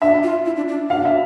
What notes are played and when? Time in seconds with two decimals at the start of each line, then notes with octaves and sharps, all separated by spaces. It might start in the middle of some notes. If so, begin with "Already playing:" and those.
0.02 D4 E5
0.23 F4
0.46 E4
0.56 D4
0.68 D4
0.90 D4 F5
1.05 E5